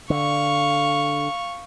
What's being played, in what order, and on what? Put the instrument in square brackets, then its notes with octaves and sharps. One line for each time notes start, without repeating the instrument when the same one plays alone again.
[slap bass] D3 [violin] F5 C#6